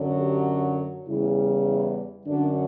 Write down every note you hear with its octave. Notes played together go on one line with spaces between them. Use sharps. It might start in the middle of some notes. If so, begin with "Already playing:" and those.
Already playing: F#2 D3 F#3
G4
E2 C#3 G3 E4
E4
F#2 D3 F#3 D4